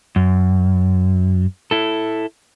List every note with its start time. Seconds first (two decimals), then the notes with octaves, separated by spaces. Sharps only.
0.16 F#2
1.71 E4 A4